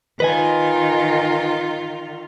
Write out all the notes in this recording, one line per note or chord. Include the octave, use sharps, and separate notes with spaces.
D#3 F4 B4 D#5 G#5